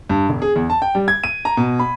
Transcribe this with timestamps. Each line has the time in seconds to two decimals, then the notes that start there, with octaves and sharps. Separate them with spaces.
0.10 G2
0.29 E1
0.42 G#4
0.56 E2
0.70 A5
0.82 G5
0.95 G3
1.08 G#6
1.24 D#7
1.45 A#5
1.57 B2
1.79 B5